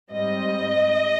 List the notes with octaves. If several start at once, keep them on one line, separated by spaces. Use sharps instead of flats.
G#2 G3 C4 D#5